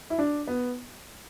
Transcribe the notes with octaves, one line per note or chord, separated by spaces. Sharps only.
E4
D4
B3